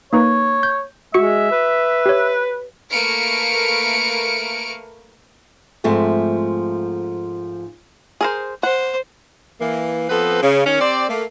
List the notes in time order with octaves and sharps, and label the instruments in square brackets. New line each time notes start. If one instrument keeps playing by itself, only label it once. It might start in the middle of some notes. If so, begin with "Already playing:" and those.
[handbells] A#3 D#4 B4 [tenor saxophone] C#5
[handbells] G6
[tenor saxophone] G#3 [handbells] F#4 C#6 C#7 [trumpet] E5
[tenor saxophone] B4
[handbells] G4 C#5
[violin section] A3 A#3 B4 F6 C#7 D7
[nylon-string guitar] G#2 F3 A3 C4
[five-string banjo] G#4 A#4 C5
[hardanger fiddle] C5 [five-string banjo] F#5
[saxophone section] E3 A#3
F3 B3 C4 A4 B4
C#3
D#3 C#4
C4 G4 C5 D5
A3 A#3